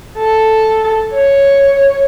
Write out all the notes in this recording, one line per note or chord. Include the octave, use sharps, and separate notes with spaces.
A4
C#5